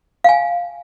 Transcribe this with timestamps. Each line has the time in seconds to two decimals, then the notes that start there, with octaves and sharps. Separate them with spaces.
0.24 F5 G5 G#5